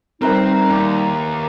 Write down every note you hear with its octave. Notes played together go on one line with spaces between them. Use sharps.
G3 C4 D#4 A#4 B4 E5
D#2